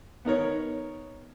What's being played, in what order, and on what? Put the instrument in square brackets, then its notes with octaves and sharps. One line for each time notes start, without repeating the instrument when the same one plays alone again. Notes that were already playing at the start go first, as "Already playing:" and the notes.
[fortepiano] B3 D#4 A#4 C#5